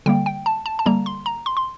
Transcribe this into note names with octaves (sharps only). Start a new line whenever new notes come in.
D3 G3 A#3 G5
G5
A5
A5
A5
D3 G3 A#3 A#5
C6
A#5
C6
C6